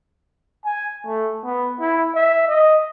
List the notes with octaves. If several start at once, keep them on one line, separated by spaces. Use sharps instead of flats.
G#5
A3
B3
E4
E5
D#5